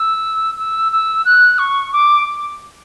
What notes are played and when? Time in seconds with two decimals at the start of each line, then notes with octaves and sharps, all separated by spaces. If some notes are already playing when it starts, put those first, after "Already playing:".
Already playing: E6
0.58 E6
0.92 E6
1.25 F#6
1.59 C#6
1.93 D6